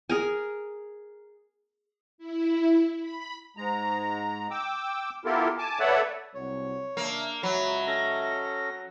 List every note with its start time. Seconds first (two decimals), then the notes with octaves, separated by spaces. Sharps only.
0.09 G#4 A#4 G#5
2.18 E4
2.99 B5
3.57 G#2 G#3 A#5
4.51 G5 D6 E6
5.25 B3 E4 F4 G4 A4 A#4
5.58 G#5 A5 D6
5.79 A4 B4 C#5 D5 E5 F#5
6.34 C2 F#3 C#5
6.97 C#3 A#3 D4 E5
7.43 C#2 F#3 D#5 E5 B5
7.87 C#4 A4 A#6